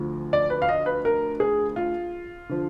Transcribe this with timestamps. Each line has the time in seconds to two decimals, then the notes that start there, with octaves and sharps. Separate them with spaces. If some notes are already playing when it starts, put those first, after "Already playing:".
Already playing: D2 D3 F3
0.33 D5
0.50 B4
0.62 F5
0.69 D#5
0.86 B4
1.05 A#4
1.40 G#4
1.76 F4
2.49 D3 F3